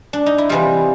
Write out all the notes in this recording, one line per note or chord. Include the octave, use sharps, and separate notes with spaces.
D4
D#4
E4
C3 E3 G3 F4